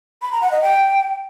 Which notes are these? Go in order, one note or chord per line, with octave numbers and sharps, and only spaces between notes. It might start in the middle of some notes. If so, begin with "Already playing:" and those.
B5
A#5
F#5
D#5
G5